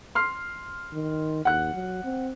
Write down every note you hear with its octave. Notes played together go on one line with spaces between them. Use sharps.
C6 F6 C7
D#3
D#2 F#5 F#6
F#3
C4